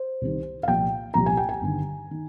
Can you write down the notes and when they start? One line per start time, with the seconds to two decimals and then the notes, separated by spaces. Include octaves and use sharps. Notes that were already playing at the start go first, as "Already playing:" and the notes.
Already playing: C5
0.21 C2 C3 D#3
0.63 F5
0.68 C2 A#2 F3 G5
1.14 C2 A#2 F3 A#5
1.26 G#5
1.37 G5
1.49 G#5
1.61 G1 G2 D#3
2.11 D#3